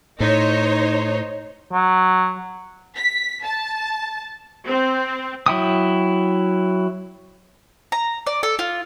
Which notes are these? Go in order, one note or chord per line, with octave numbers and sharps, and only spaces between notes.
A2 D#4 C5 C#5
F#3
B6
A5
C4
F#3 E4 G5 D#6
A#5
D5
A4
F4